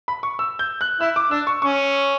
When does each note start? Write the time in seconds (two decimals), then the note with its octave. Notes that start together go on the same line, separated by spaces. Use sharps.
0.08 B5
0.23 C#6
0.39 E6
0.59 G6
0.81 F#6
1.01 E4 E6
1.16 D6
1.31 D4 E6
1.47 C#6
1.62 C#4 C#6